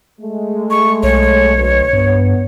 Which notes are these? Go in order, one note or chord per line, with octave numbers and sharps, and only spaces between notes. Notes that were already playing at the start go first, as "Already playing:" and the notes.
G#3 A3
C#6
B1 C#5
D2 B2
G2 B3